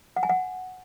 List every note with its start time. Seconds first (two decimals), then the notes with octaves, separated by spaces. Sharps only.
0.16 F#5
0.23 G#5
0.29 F#5